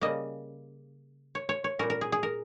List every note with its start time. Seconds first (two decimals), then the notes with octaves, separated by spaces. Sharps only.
0.01 C#3 G3 A#3 D#5
1.35 C#5
1.49 C#5
1.64 C#5
1.79 A#2 G3 C#4 A#4
1.90 A#4
2.01 G#4
2.12 G#4
2.23 A#4